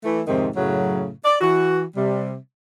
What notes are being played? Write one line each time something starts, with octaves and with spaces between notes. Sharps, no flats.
E3 A3
F2 G#2 C3 D#3 C4
F#2 A2 C#3 F#3
D5
E3 F#4
C3 G3